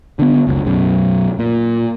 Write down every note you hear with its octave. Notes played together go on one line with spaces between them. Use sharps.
D3 B3
F#1 C#2
B1 F#2
A#2